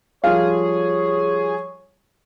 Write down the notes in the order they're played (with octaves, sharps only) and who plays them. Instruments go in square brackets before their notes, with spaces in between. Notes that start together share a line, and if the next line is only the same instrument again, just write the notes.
[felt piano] F3 G3 F4 [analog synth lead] G#4 [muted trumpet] C#5 [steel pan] F5